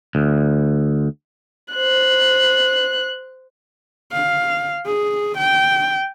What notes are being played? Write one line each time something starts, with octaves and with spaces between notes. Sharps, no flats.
D2
C5 F#6
F5
G#4
G5